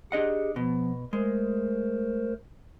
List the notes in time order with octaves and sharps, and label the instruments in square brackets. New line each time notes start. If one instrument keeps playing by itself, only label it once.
[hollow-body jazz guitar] D4 D#5 F#5 [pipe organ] G4 G#4
[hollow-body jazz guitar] B2 [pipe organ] F3 B3
[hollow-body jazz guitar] G#3 [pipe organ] A3 A#4 C5